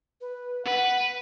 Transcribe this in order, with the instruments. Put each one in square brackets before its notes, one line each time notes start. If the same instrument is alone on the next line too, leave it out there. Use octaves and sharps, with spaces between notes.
[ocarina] B4
[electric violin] B4 [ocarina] F#5